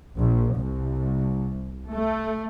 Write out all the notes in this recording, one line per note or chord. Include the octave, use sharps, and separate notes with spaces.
A#1
C2
A3